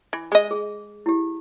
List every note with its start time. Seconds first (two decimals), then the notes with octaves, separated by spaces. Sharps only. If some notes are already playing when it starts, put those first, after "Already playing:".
0.13 E3
0.32 G#3 D#5
0.51 G#4
1.06 E4 G4